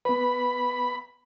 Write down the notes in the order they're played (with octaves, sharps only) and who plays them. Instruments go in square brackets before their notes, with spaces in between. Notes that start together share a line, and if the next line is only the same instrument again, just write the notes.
[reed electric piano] B3 B4 [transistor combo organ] B5